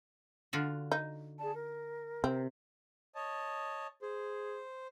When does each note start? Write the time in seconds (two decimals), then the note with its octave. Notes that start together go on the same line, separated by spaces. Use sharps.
0.53 D3 F4 F#4
0.92 D#4
1.39 G#4 D5 A5
1.54 A#4
2.24 C3 C4
3.15 C#5 D#5 A5
4.02 G#4 C5